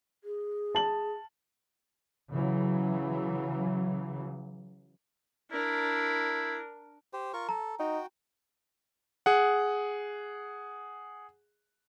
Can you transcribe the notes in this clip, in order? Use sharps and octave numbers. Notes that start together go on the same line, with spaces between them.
G#4
A5 F#7
C#3 E3 F#3
D4 E4 A#4
G4 C5
F4 A#4 C#6
A4 A#5
D#4 F#4 G5
G#4 F#5